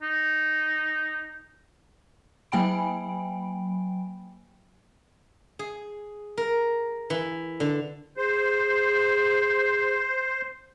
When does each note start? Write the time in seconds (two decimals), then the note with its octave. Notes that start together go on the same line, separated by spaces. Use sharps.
0.03 D#4
2.52 F#3 A#3 G5 G#5 B5 D7
5.59 G#4
6.37 A#4
7.10 E3
7.60 D3
8.17 G#4 C5